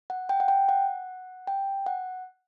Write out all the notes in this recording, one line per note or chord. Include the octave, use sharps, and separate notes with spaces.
F#5
G5
F#5
G5
F#5
G5
F#5